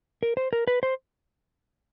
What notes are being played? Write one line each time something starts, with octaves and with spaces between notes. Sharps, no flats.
A#4
C5
A#4
B4
C5